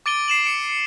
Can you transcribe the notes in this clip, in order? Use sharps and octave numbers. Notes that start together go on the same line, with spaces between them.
D6 A6 D7 D#7 G7
C7 E7 F#7
D6 C#7 D7 E7
C#7